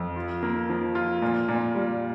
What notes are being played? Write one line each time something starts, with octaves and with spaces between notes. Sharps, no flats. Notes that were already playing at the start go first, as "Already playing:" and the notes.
Already playing: F2
F4
A#3
F3
F4
A#2
A#2
G3